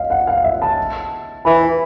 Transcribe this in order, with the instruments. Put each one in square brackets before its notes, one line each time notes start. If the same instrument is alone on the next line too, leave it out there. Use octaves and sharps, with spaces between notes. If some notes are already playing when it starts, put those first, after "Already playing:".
Already playing: [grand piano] D#5 F5
F#5
F5
E5
A5
[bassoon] E3 [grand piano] B5